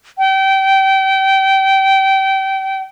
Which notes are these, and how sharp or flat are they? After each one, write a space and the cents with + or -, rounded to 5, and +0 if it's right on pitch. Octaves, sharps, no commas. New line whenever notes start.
G5 -25